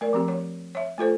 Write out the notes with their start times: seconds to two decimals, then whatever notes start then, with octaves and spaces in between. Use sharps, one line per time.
0.01 A3 A#4 D5
0.13 F3 C4 G4
0.28 C#5
0.75 C#5 E5
0.98 A3 F4 A4 C5